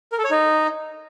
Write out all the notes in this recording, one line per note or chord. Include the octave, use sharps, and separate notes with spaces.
A#4
A4
C#5
D#4